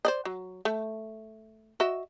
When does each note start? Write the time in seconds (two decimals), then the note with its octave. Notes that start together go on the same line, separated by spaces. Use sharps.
0.05 C5 D5 D#5
0.25 F#3
0.65 A3
1.80 F#4 D#5 E5